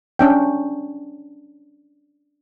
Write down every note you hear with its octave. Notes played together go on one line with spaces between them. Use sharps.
C#4 D4 G5